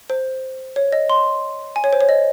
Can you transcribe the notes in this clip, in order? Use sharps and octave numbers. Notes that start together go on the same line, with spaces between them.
C5
C#5
D#5
C6
G#5
C#5
C5
C#5
D#5